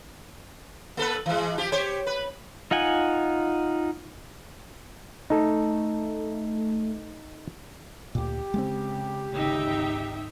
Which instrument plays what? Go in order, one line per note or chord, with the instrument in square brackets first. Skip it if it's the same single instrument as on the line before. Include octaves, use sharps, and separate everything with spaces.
[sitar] A#3 A4 B4
E3 G#3
F3 G4
G4 C5 C#5
B4
[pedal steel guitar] D#4 F4 F#5 G#5
[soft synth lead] A3 [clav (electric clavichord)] D#4 A4
[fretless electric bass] D2 A#2 [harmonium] G4
[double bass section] C#3 [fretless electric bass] G#3 A#3 C4
[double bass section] G#1 D2 C#3 [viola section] D#4 E5 G5